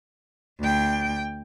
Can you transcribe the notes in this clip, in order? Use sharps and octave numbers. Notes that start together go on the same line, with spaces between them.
D2 G5